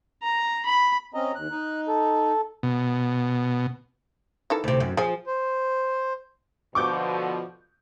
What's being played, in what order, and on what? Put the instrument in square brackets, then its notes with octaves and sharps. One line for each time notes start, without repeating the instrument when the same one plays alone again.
[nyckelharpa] A#5
B5
[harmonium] C4 C#4 D#5 [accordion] A#5
[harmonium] D#2 [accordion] F#6
[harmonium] D#4
[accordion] A4
[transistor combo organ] B2
[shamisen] D#3 E3 A4
[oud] D2 C3
F#2
[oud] F3 [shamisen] G#4 G#5
[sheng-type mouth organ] C5
[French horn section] B2 D3 F3 [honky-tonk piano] C#6 D6 G6